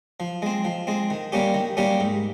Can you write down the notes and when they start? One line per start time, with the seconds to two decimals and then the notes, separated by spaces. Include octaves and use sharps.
0.20 F3
0.42 G#3 C4
0.65 F3
0.87 G#3 C4
1.10 D#3
1.32 G3 A#3 C#4 G4
1.54 D#3
1.77 G3 A#3 C#4 G4
2.00 G#2